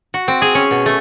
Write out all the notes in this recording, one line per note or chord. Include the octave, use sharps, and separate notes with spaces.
F#4
C4
G#4
C#4
B2
A3